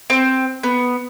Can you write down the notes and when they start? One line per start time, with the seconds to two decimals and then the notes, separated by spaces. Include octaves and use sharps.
0.10 C4
0.63 B3